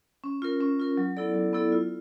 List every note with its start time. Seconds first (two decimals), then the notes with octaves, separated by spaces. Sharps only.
0.24 C#4
0.42 F4 A#4
0.61 C#4
0.80 F4 A#4
0.97 F#3
1.17 B3 E4 A4 D5
1.34 F#3
1.53 B3 E4 A4 D5
1.72 F4